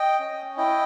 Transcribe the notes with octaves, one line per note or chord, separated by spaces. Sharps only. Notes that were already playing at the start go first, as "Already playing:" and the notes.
Already playing: D#5 G5
C#4
E4 D#5 G5